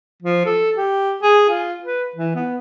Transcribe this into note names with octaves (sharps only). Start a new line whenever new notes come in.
F3
A4
G4
G#4
F4
B4
E3
B3